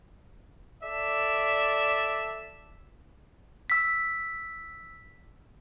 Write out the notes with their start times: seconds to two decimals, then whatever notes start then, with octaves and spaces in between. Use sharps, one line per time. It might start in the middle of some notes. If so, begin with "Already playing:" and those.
0.84 A4 D5 E5
3.70 E6 B6